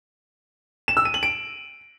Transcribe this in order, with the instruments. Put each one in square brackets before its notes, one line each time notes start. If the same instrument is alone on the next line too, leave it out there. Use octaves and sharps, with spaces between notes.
[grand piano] E7
E6
D#7
F#7
D7